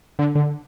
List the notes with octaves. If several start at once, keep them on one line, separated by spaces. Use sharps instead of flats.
D3
D3